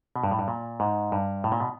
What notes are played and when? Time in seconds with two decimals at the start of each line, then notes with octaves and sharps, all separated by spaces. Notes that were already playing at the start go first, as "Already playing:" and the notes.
0.16 B2
0.23 G2
0.31 A2
0.39 G2
0.48 A#2
0.80 G#2
1.12 G2
1.44 A2
1.52 A#2
1.60 B2